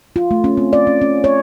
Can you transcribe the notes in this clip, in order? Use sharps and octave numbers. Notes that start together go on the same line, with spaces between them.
F4
A3
C#4
C4
D5
C#4
C#4
C#5